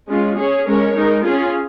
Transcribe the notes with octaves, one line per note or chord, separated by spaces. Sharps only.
G#3 C#4 F4
C#4 G#4 C#5
G#3 C#4 A#4 C#5
G#3 D#4 A#4
C#4 F4 G#4